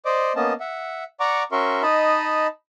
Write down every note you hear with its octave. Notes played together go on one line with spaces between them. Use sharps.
C5 D5 D#5 D6
A#3 B3 C#4 D#5 A5
E5 F#5
D5 F#5 A#5 C#6 D6
C#4 F#4 A#4 E5 C6 C#6
D#4 D#5 A5 B5